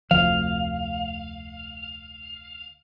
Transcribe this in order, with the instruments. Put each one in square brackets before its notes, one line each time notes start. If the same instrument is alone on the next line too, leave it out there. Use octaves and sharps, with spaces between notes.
[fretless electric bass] F1 D2 F3 [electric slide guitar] F5